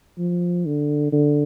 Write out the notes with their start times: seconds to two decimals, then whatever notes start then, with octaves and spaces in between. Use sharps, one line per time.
0.19 F3
0.66 D3
1.12 D3